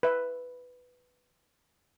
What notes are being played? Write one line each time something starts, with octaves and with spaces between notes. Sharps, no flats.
B4 E5